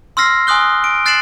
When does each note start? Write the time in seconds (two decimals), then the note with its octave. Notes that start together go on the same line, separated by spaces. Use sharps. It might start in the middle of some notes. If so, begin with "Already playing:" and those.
0.17 C6 E6 F6 A#6 C7
0.47 G#5 C6 D#6 F#6 G7
0.84 D7
1.06 F#6 A6 C7 D7 E7 F#7